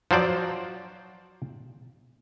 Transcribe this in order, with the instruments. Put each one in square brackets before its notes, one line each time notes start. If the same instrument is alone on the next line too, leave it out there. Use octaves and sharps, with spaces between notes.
[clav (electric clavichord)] F3 F#3 C5 D5